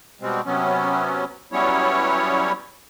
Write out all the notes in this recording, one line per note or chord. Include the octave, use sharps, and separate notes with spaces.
B2 G3 G#3 C4
C3 F#3 B3 C#4
F#3 G3 B3 C#4 E4 C#5